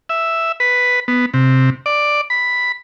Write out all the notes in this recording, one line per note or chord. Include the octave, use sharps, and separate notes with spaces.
E5
B4
B3
C3
D5
B5